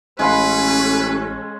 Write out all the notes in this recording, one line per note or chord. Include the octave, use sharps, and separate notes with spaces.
A1 G#3 C#4 A4 B4 F5 B5